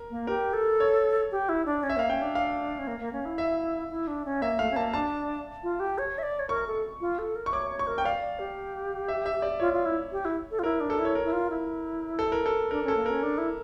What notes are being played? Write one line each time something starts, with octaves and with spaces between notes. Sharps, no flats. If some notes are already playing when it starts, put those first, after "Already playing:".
Already playing: A#4
A#3
G4 A#4
A4
C#5
G4
E4
D4
C#4
E5
A#3 F5
C#4 G5
D4
F5
C#4
A#3
A#3
C#4
E4
E5
E4
D4
C#4
A#3 E5
A3 F5
C#4
A#3 A5
D4 A5
F4
G4
C#5
E5
D5
C#5
A#4 C#6
A4
F4
A4
A#4
C#6
C#5 D6
C#5
C#6
A#4
G5
D5 F5
D5
G4
E5
E5
D5
F4 C#5
F4
E4
G4
E4
A4
F4
E4 A#4
D4
A4
E4
C#5
A#4
E4
F4
E4
A4
A#4
A4
D4 A#4
C#4 A4
A#3
C#4 A#4
D4
E4